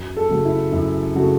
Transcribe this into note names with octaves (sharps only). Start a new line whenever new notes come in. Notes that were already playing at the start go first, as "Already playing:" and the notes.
Already playing: F#2
A4
C#3 F#3 A3
E4
F#2 E4
C#3 F#3 A3 F#4